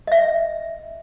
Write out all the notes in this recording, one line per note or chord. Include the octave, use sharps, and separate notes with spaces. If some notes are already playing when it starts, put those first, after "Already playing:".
D#5 E5